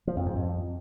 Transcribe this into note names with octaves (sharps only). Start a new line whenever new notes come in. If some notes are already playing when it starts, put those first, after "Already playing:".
F3
F2
G#2
F2